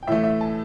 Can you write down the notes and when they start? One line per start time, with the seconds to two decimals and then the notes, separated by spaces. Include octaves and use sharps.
0.03 G5
0.07 A2 E3 A3 E5
0.24 E5
0.41 A5